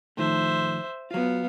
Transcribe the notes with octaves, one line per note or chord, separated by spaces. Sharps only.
A2 D#3 F3 C5 E5
F#3 B3 F4 F5